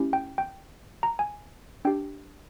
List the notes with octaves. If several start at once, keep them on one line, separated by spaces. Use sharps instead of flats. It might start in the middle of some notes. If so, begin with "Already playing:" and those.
Already playing: A3 C#4 E4 G4
G5
G5
A#5
G#5
D4 G4 G5